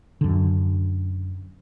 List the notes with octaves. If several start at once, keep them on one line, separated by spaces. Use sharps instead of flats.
F#2 D3